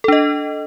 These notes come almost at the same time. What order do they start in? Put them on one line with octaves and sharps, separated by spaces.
A4 D4 D#5